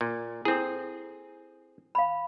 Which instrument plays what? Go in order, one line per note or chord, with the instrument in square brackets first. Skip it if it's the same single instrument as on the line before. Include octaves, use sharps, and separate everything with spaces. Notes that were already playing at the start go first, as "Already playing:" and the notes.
[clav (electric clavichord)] A#2
[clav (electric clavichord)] C4 G#4 [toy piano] E4 A4
[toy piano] F5 B5